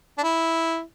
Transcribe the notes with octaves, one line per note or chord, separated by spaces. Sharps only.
D4
E4